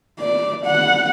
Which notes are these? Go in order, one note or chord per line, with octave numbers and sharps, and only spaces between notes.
D5
F#5